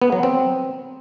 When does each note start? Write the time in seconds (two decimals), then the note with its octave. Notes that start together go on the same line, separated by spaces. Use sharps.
0.02 B3
0.12 F#3
0.23 C4